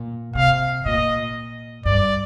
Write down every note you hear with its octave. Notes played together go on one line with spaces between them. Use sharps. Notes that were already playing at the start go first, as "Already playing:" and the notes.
Already playing: A#2
C3 F5
A#2 D#5
G2 D5